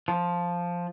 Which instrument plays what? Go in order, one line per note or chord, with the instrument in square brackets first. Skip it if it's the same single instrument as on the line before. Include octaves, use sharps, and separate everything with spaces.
[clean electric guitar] F3